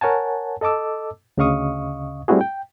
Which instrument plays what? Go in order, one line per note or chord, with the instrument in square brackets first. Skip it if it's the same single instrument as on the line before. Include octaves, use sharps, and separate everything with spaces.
[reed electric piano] A#4 C#5 F#5 G#5 A5
A4 D#5 A5 D6 E6
D2 C#3 D#5 F5 C#6 D#6
G3 A3 C4 E4 F#4 G#4
G5